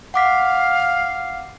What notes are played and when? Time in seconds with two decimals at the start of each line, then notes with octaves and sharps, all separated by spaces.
0.14 F5 F#5 D6 B6